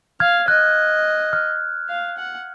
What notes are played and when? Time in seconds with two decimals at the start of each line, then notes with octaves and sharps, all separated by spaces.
0.20 F5 F6 G#6
0.48 D#5 F#6
1.33 F6
1.89 F5
2.17 F#5